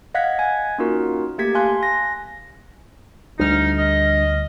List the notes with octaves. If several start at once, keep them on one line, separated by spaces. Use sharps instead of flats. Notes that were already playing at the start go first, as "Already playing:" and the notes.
D#5 F5 F#5 F#6 G#6 B6
D#5 G#5 G#6
A#3 C#4 D#4 F4 F#4 A#4
A3 A#3 G4 G#6 B6
F5 G#5 A5 C6 F#6
G#5 A#6
D2 G3 D4 D#4 F6
D#5